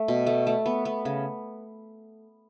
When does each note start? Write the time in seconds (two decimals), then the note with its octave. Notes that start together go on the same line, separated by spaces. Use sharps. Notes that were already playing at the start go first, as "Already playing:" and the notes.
Already playing: A3
0.08 B2
0.27 A3
0.47 A3
0.66 B3
0.85 B3
1.05 C#3